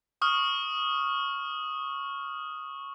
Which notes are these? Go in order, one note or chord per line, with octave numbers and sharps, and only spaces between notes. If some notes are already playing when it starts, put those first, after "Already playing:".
C#6 D#6 F6